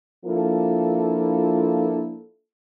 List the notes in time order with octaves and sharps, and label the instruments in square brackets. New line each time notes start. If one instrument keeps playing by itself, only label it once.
[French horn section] F3 A#3 D4 E4 F4 A4